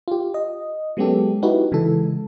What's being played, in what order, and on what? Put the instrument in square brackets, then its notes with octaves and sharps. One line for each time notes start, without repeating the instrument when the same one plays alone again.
[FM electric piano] F4 G4
D#5
F#3 G#3 B3 C#4 G4 A4
D#4 E4 F#4 G4 B4
C#3 E3 G#3 A4